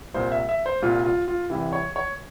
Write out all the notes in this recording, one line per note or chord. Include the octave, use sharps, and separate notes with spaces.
C2 A#2 C5
E5
E5
C5
C2 A#2 F4
F4
F4
C2 C3 E3
C#5
C#5